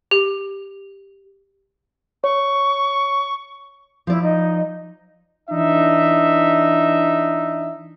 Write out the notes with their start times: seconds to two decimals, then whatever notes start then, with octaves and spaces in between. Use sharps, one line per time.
0.11 G4
2.24 C#5 C#6
4.07 F3 E4 D5
4.22 D#4
5.50 E3 D4 D#4 E5